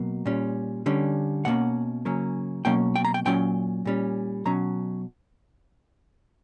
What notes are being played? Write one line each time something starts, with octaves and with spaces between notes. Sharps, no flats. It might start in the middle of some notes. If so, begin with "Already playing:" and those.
Already playing: B2 F#3 A#3
A#2 G3 C#4
D3 G3 C#4
B2 A#3 C#4 F#5
C#3 F#3 A#3 C#4
B2 F#3 A#3 C#4 G5
G5
A#5
G5
A#2 F#3 C#4 G5
A#2 G3 C#4
B2 F#3 C#4 A#5